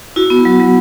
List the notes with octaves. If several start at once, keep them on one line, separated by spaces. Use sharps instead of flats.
E4 F#4
B3
F#3
F#3